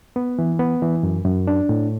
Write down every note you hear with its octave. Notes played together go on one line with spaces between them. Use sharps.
B3
E3
B3
E3
F#2
F#2
D4
A2